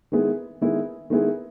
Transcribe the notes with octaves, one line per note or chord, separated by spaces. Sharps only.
D#3 G#3 B3 E4 G#4
D#3 G#3 B3 E4 G#4
D#3 G#3 B3 E4 G#4